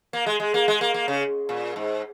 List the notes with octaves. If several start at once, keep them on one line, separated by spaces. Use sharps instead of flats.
A#3
G#3
G#3
A#3
G#3
A#3
A#3
C#3
A#2
G#2